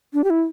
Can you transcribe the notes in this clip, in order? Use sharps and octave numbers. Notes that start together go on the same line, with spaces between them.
D4
G4
E4